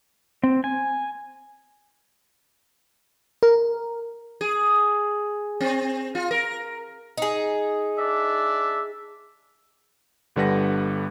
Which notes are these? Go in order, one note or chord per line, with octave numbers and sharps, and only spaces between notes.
C4
G#5
A#4
G#4
C4
F4
A#4
D#4 G#4
D4 D5 E5
G1 D3 G3 B4 F#5 A#6